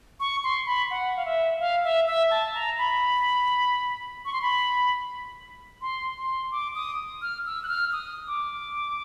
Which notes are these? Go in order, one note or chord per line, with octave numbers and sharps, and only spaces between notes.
C#6
C6
B5
F#5
F5
E5
F5
E5
E5
A5
A#5
B5
C#6
C6
B5
C6
C6
D6
D#6
F6
E6
F#6
F6
D#6
D6